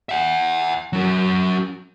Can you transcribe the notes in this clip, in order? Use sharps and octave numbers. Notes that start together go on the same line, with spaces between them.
E5 F#5
F#3 C#4